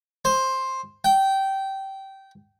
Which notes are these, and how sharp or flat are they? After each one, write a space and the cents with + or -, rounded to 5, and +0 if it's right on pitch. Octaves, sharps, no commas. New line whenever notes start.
C5 +10
G5 -20